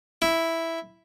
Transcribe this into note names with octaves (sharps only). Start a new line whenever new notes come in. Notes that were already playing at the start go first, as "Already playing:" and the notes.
E4